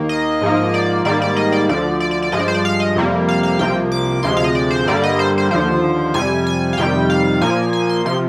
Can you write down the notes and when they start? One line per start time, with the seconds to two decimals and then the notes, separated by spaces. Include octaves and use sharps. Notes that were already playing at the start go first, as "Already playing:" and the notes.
Already playing: D#2 D#3 A#3
0.09 D#5
0.41 G#2 F3 A#3
0.74 D5
1.05 G#2 D#3 G3 A#3 D5
1.22 D5
1.36 D#5
1.52 D5
1.69 D2 D3 F3 D5
2.00 D5
2.11 D5
2.22 D5
2.32 G2 F3 G#3 D#5
2.39 D5
2.48 C5
2.54 D5
2.65 F5
2.80 D#5
2.96 F2 C3 G3 A#3
3.29 F5
3.43 F5
3.59 C2 C3 F3 A#3 G5
3.92 D6
4.23 D2 C3 F3 G#3 C6
4.37 F5
4.44 D#5
4.55 D5
4.71 C5
4.86 G2 D3 G3 A#3 D5
5.04 D#5
5.19 C5
5.38 C5
5.51 D#2 D3 F3 C5
6.14 F2 C3 G3 G#5
6.47 G#5
6.73 F5
6.78 F2 C3 D#3 G3 G5
7.10 F5
7.41 A#2 F3 A#3 G#5
7.73 G#5
7.89 C6
8.05 C3 F3 C6